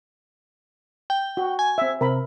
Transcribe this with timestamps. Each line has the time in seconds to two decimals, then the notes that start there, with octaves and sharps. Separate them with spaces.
1.10 G5
1.37 F#4
1.59 G#5
1.78 C4 E5
2.01 C3 A#4 B5